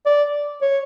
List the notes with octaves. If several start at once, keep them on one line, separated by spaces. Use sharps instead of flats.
D5
C#5